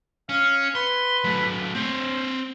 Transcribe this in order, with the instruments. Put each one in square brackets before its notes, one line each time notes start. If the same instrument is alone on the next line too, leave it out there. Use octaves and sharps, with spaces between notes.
[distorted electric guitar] C#4 [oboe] F5
[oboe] B4 [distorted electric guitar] C6
[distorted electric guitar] F#3 A3
[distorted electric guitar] C4 C#5 [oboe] C5